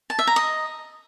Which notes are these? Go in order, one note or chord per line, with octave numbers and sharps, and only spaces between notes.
A5
E5
A#5
D#5